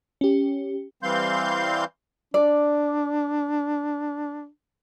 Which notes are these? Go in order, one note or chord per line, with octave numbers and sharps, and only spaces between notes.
C#4 G4
E3 G3 C4 F5 C6 G6
D4 D5